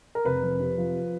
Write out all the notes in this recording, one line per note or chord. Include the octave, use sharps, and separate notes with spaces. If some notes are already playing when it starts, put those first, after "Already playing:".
A#4
F1 B4
F2
C3
F3